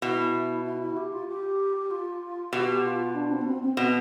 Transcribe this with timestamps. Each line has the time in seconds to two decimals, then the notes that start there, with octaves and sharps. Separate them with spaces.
0.02 B2 E4
0.65 E4
0.81 E4
0.96 G4
1.12 F4
1.27 G4
1.90 F4
2.52 B2 G4
2.84 F4
3.14 D4
3.31 C4
3.41 B3
3.46 C4
3.62 C4
3.77 B2 B3